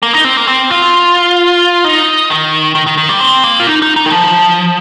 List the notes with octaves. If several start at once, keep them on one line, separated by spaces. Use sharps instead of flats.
A#3
D#4
C4
A#3
C4
F4
D#4
D#3
D#3
D#3
D#3
G3
C4
A#3
F4
D#4
D#4
D#4
D#3
F3